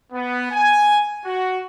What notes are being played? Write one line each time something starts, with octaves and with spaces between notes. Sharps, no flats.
B3
G#5
F#4